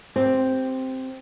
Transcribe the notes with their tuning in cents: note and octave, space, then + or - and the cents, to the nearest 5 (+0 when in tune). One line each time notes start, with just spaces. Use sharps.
C4 +0 G4 +0